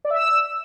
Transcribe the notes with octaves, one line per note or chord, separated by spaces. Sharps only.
D5
E5
E6